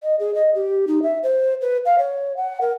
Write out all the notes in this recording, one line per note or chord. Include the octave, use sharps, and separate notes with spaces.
D#5
G#4
D#5
G4
D#4
E5
C5
B4
F5
C#5
F#5
A#4